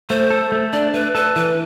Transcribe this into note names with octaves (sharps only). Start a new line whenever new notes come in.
A3 C5
A4
A3
D4 D5
A3 B4
A4 B4
E3 B4